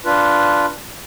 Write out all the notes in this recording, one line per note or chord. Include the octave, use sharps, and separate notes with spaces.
D4 F4 B4